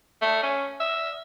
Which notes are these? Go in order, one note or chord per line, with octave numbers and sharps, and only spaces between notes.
A3
C#4
E5